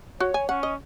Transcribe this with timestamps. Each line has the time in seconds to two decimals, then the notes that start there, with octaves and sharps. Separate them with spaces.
0.20 F#4 C#5
0.34 G#5
0.49 C#4 F#5
0.63 D#5